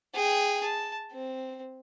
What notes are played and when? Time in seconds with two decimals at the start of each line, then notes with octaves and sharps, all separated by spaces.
0.14 G#4 G5
0.64 A5
1.12 C4